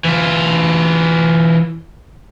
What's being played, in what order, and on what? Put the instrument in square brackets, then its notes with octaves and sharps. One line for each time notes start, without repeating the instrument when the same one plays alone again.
[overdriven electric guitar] E3 F4